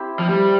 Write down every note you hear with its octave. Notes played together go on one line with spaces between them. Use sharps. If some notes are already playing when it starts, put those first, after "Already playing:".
Already playing: C4 E4 G4
F3
G3